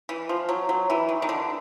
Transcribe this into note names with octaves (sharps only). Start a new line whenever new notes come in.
E3
F3
F#3
F#3
E3
D#3
D#3
D3